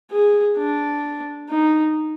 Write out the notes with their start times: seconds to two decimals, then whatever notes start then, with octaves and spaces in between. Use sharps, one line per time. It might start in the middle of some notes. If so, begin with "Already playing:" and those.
0.11 G#4
0.57 D4
1.50 D#4